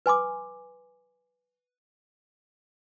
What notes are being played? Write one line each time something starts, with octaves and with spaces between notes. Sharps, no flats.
B4 G#5 C6 D6